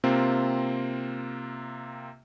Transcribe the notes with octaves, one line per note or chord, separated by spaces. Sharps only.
C3 A#3 C4 F4